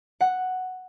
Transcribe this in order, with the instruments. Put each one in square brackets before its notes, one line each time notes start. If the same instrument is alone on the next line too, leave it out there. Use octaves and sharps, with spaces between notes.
[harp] F#5